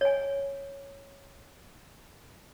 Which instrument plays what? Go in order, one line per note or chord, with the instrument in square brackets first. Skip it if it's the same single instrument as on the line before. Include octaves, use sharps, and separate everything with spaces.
[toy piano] C#5 G#5